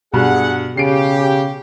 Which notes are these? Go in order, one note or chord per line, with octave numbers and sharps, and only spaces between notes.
G2 B2 G#4 F#5
C#3 G4 C7 D7